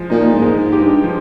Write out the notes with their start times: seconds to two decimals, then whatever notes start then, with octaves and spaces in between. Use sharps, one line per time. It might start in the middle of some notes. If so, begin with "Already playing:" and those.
Already playing: F3 G#3
0.10 A#2 D#4
0.34 G#2
0.42 G#3
0.57 G#2
0.72 G4
0.81 G2
1.04 F3